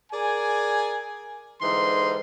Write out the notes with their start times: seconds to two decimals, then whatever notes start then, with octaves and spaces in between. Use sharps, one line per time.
0.12 G#4 A#4 D5 G#5
1.62 G#2 D3 E3 G3 D#4 C6